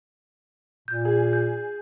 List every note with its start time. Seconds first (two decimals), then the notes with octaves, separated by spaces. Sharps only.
0.88 A#2 G6
1.05 G#4
1.33 G6